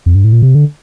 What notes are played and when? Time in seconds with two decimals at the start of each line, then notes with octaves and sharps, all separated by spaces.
0.06 F2
0.15 G2
0.24 A2
0.33 A#2
0.42 C3
0.55 D3